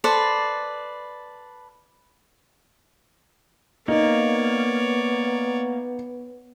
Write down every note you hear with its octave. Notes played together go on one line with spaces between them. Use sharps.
A4 B4 C5 D5
A#3 B3 D#4 C#5 D5